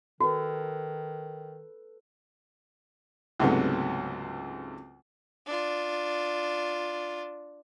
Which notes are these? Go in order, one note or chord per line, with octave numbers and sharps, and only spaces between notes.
D#3 F#4 A4 B4
C#2 G#2 C3 F#3 A3 B3
D4 F4